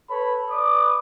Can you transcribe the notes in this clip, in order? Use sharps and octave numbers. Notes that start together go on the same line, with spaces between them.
A4 B4 C#5 B5
B4 D5 D6 D#6